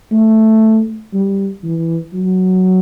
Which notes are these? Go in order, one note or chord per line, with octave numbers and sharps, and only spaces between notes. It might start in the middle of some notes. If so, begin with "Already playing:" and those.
A3
G3
E3
F#3